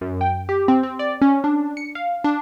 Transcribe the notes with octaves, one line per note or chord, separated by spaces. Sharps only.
F#2
G5
G4
C4
C4
D5
C#4
D4
C#7
F5
D4